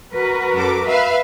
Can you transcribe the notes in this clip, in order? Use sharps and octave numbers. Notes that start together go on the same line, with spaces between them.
F#4 A#4 B4
F#2 A4 D6
B4 E5 F5